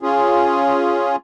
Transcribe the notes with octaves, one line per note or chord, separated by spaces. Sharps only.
C#4 F4 G#4